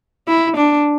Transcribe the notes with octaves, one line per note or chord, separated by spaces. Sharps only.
E4
D4